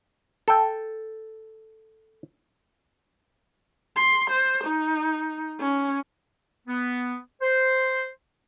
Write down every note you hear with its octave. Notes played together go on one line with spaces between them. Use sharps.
A4 G5
C6
C5
D#4
C#4
B3
C5